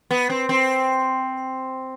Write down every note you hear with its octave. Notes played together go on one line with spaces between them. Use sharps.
B3
C4
C4